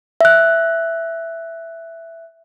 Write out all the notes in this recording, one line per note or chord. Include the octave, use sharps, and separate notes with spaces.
E5 F#6